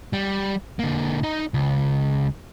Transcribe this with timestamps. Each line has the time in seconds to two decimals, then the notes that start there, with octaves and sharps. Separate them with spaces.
0.13 G3
0.79 D3 A#3
1.23 D#4 D#5
1.54 C#2